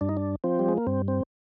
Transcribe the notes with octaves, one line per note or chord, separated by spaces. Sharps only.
G2 D4
D#4
D4
F3 C4
G3
G#3
A#3
G2 C4
C4